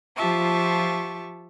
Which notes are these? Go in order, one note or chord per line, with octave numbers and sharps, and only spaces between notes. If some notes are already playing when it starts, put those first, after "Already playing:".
F3 F4 G4 E5 A5 C#6